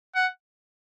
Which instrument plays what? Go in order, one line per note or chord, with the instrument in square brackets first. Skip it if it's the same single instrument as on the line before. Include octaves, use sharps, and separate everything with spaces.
[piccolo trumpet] F#5